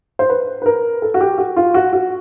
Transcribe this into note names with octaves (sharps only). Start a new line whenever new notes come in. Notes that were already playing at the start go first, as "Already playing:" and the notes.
C5
B4
B4
A#4
A4
F#4
G4
F#4
F4
F#4
F#4